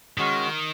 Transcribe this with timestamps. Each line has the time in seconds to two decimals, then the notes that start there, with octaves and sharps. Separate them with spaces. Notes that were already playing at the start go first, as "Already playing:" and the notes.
0.18 D#3 G#3 C#4 F#4